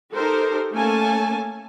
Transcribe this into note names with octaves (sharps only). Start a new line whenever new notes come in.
D#4 G4 A4 A#4 C5
A3 A#3 C#4 A4 G#5 A5